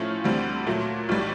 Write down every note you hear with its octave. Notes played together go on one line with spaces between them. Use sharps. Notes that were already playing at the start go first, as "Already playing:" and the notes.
Already playing: A2 F3 A3 C#4 F4
D2 D3 G3 C4
A#2 F#3 A3
B1 A2 E3 G3